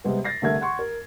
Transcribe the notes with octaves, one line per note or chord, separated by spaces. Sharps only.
C3 G3 G#3 B3
A6 A#6 C7
C2 D3 A3 A#4 E5 G#6
F#5 C6 C#6
A#4